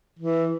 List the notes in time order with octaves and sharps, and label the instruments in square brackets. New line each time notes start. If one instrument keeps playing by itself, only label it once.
[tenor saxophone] E3